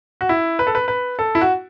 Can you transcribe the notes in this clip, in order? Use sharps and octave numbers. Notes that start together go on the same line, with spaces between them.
F#4
E4
B4
A4
B4
B4
A4
E4
F#4